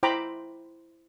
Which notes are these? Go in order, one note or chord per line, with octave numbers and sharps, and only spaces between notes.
E4 C5 G5 A#5 B5 D6